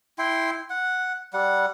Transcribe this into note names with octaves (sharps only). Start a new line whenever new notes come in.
E4 G5 C6
F#5
G3 F#5